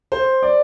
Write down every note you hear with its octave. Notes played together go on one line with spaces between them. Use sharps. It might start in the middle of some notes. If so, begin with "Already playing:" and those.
C5
D5